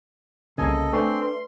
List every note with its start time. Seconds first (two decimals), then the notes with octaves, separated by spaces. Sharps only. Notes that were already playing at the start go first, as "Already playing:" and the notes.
0.58 C2 C#3 A#3 G#4 A4 D#5 G#5
0.93 A3 C4 D4 B4 G#5 C6 C#6
1.22 B4 C6